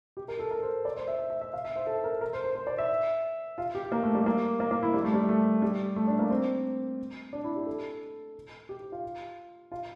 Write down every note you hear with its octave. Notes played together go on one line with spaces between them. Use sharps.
G4
A#4
A4
A#4
C5
D5
C5
E5
E5
E5
E5
F5
E5
C5
A4
A#4
A#4
C5
C5
C5
D5
E5
F4
G4
A#3
A3
G3
A#3
A#3
A#3
E4
G3
A3
G3
A3
G3
A3
D4
A#3
C4
D4
E4
G4
A4
G4
F4
F4